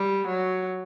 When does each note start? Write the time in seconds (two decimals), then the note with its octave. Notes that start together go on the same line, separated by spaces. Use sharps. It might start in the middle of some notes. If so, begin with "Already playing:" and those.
Already playing: G3
0.27 F#3